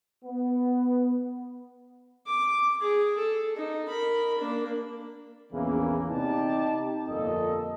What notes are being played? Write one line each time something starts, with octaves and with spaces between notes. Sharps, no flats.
B3
D6
G#4
A4
D#4
A#4 B5
A#3 D4
A#1 E2 C#3 E3 A#3
C3 C4 D#4 G4 D5 A5
G1 F2 A#2 A4 D#5